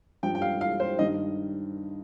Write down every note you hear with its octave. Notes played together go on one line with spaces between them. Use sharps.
G2 F3 G5
G5
F5
F5
C5
G2 D#3 D#5